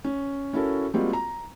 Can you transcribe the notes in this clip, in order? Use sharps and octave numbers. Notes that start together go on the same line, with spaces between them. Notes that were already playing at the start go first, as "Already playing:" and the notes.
C#4
C#4 E4 F#4 A4 A#4
G3 G#3 A#3 C4 F4 F#4
A#5